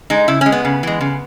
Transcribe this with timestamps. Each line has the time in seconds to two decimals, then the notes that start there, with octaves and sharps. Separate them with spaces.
0.10 G#3 D#4
0.28 C#3 E4
0.41 G#3 C#4
0.52 B3
0.65 C#3
0.83 E3 G#3
1.01 C#3